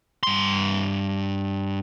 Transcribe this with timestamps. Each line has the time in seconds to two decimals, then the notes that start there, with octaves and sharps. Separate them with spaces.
0.23 G2 C6